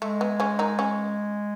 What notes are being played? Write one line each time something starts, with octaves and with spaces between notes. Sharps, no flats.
G#3 A3
B3
C#3 C#4
D#3 D#4
C#3 C#4